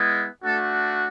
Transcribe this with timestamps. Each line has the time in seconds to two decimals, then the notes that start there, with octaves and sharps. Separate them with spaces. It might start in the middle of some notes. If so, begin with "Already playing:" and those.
Already playing: G#3 B3 E4
0.43 A3 D4 F#4 A4